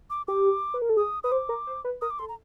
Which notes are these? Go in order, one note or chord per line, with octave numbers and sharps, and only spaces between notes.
D6
G4 D6
B4
A#4
A4
G#4 D#6
B4 D#6
C5 D6
A#4
C5
B4
A#4 D#6
D6
A4 C6
A#5